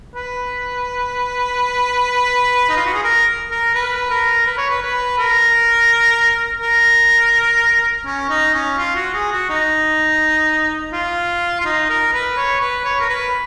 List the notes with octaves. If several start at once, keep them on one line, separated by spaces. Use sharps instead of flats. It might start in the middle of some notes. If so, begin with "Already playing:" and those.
B4
D#4
F4
F#4
G#4
A#4
A#4
B4
A#4
B4
C#5
B4
B4
A#4
A#4
C#4
D#4
C#4
F4
F#4
G#4
F#4
D#4
F4
F4
D#4
A#4
B4
C#5
B4
C#5
A#4
B4